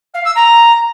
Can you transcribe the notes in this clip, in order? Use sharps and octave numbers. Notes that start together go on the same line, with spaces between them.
F5
E6
A#5